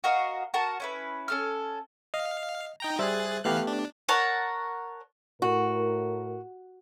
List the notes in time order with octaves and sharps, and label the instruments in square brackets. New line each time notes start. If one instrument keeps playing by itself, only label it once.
[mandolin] F#4 A#4 D#5 F5
F#4 A#4 A5
C#4 E4 B4
C#4 A4 F6
[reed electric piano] D#5 [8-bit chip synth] F5
[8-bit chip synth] D#4 G5 A#5
[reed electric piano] G3 C5 E5 [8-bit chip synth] G#4 F#6 A6
[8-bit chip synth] E3 F5 F#6 [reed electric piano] A3 B3 G4
[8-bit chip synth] D4
[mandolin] A#4 C#5 F#5 A5
[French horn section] A2 A#4 [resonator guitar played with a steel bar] F#4